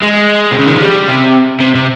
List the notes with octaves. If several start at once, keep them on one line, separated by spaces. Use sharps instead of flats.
G#3
C3
C#3
D#3
F3
G3
C3
C3
C3